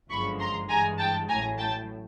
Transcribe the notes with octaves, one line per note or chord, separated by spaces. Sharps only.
G1 F#2 D3 F3 G#3 B5 C#6
A#5 C6
G2 E3 G#3 G#5 A#5
G5 A5
A1 A2 F#3 G#5 A#5
G5 A5